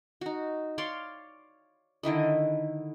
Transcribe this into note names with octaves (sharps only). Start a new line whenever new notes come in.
D#4 F#4
C#5 D5 F5 C6
D3 D#3 E4 D#5